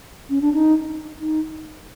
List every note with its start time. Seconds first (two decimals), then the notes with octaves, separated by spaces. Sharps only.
0.30 C#4
0.41 D4
0.54 D#4
1.20 D#4